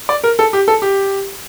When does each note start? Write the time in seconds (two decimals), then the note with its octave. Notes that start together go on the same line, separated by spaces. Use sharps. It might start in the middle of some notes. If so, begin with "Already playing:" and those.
0.09 D5
0.24 A#4
0.39 A4
0.53 G4
0.68 A4
0.82 G4